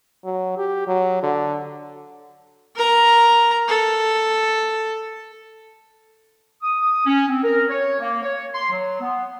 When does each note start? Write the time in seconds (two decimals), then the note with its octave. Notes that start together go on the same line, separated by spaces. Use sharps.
0.24 F#3
0.58 G4
0.87 F#3
1.23 D3
2.76 A#4 A#5
3.68 A4
6.63 D#6
7.06 C#4
7.28 C4
7.43 A#4
7.69 C#5
8.00 A#3
8.23 C#5
8.54 C6
8.71 F#3
9.01 B3